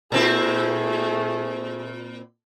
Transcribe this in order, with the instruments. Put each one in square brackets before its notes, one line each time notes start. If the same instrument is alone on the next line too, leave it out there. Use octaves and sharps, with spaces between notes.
[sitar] A#2 C4 E4 [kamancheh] A3 G#4